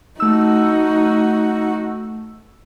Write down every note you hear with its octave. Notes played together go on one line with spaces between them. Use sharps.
A3 D#4 F#4 E6